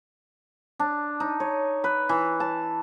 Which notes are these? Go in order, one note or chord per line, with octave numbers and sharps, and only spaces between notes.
D4
D#4
C#5
B4
E3
A5